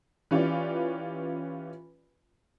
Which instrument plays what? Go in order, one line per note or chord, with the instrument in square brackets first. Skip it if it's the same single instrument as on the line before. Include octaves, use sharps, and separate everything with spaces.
[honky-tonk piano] E3 C#4 F4 G4 B4 D5